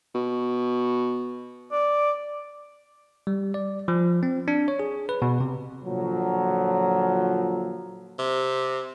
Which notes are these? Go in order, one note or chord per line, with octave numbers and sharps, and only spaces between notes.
B2
D5
G3
D5
F3
C4
D4
C#5
G#4
B4
B2
C3
A#2 D3 F3 F#3
C3